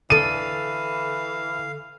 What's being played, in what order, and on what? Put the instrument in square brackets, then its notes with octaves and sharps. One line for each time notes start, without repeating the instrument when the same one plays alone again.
[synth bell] D3 A4 [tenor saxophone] E3 [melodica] F5 [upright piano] D#7